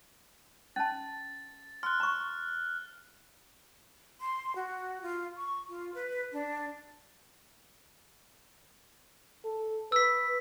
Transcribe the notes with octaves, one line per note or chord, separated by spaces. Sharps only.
C#4 A5 A6
C6 F6 F#6
A#5 C#6
C6
F#4
F4
C#6
F4
B4
D4
A4
B4 E6 B6